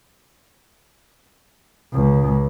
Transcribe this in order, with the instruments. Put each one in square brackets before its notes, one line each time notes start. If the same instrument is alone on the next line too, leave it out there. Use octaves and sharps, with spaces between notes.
[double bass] C#2